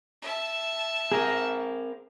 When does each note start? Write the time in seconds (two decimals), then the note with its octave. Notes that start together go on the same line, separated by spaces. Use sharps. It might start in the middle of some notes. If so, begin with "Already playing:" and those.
0.22 E5 A5
1.12 C4 G#4 A#4